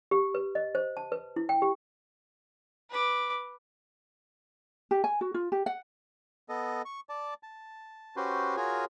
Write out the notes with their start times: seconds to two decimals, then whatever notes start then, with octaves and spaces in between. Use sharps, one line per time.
0.11 G4
0.35 B4
0.55 D#5
0.75 C5
0.97 A5
1.12 B4
1.36 E4
1.49 G5
1.62 G4
2.90 B4 D6
4.91 G4
5.04 G#5
5.21 F#4
5.34 F4
5.52 G4
5.66 F#5
6.49 B3 A4 D#5
6.85 C#6
7.09 D5 A5
7.43 A5
8.16 C#4 F#4 G4 B4 C5
8.57 F4 F#4 G#4 A#4 C#5 G#5